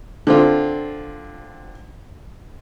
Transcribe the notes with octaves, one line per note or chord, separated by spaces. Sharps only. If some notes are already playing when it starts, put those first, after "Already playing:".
D3 C4 F4